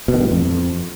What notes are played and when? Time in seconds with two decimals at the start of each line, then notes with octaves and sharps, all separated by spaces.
0.08 B2
0.14 D#3
0.20 G2
0.25 A2
0.31 F2